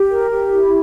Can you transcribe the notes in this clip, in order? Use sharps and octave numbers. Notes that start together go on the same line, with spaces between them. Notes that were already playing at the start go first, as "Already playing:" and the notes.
Already playing: G4
A#4
G4
E4